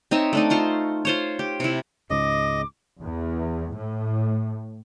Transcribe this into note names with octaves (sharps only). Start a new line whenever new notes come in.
C4 D#4 C#5 E5
A3 D4 D#4
F4 C5 C#6
F4 C5 C#5
G4
C3 E4
C#2 G#2 C#3 D#5 D6
E2
A2